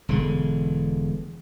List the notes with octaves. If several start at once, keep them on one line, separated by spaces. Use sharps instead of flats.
E1 D3 G#3